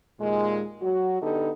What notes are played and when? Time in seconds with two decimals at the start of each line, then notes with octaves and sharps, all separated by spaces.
0.20 D#2 A#2 G#3
0.82 F#3 F#4
1.22 D3 B3 D#4 G4 A4